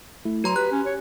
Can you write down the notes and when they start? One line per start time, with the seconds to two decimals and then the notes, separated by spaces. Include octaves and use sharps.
0.25 A3 E4
0.44 F#3 F#4 B4 A#5 C6
0.56 G4 B4 F#6
0.72 C#4
0.86 C#5